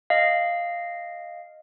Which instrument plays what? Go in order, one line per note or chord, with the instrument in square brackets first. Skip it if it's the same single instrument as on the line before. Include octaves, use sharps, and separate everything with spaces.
[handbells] D#5 F5